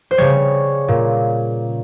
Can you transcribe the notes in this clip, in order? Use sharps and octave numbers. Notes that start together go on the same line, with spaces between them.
C5
C#3 G3 C#5
A#2